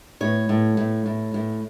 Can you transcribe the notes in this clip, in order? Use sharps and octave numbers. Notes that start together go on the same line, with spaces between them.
A2 C#5
A2
A2
A2
A2